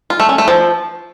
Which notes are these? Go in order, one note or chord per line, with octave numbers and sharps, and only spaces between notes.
F4
A3
C#4
A3
F3